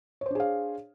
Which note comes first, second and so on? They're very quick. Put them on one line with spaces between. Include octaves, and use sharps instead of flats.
C#5 C5 D4 G#4 F5